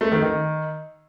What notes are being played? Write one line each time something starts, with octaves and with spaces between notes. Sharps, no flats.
A3
D#3
D#3